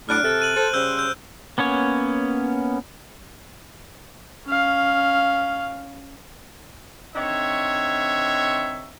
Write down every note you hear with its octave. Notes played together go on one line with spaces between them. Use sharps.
A2 F#3 D4 F6 F#6 D7
C3 A4
F#6 D#7 F#7
A4 C5
C#3 G3 C5 E6 G6
E6 G6
A#3 B3 C#4 C#5
C#4 F5
D3 C4 D#4 C#5 E5